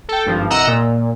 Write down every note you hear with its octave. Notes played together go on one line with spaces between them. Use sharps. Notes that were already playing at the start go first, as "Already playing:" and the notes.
A4 G5
G#1 G2 F3
C2 D#5 F#5 A#5 E6
A#2